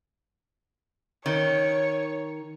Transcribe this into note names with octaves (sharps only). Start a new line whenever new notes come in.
D#3 C#5